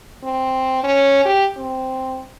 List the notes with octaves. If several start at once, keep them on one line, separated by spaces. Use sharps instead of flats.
C4
C#4
G4
C4